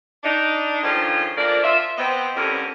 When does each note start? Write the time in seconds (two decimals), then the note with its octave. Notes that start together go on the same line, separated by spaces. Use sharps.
0.24 D4 D#4
0.83 D3 D#3 F3 C#4 F4 G#4
1.37 F3 A3 A#3 D4 A#4 D5
1.64 F4 E5
1.98 B3 C4 D#5
2.36 F2 A2 D3 G3 C#4 A#4